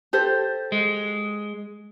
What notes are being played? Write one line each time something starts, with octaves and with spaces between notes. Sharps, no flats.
G4 A4 C5
G#3